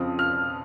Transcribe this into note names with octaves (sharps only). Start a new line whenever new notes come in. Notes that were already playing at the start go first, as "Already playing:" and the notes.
Already playing: F2 C#3 F3 C4 F4 D#6
F6